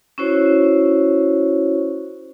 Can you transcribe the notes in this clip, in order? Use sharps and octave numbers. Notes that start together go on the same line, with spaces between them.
C#4 E4 F#4 C5 C#5